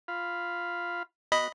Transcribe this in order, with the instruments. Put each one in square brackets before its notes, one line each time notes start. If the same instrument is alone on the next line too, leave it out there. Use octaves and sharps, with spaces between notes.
[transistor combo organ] F4 F5 B5
[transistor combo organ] B3 F#4 [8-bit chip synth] D#5 B5